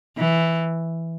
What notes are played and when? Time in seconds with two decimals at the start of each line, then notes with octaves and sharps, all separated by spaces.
0.17 E3